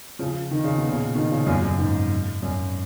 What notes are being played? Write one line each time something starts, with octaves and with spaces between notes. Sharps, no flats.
C#3 F3
D#3
C#3
B2
A#2 C#3
B2 D#3
C#3 F3
F#2 A#2
F#2
G#2
F#2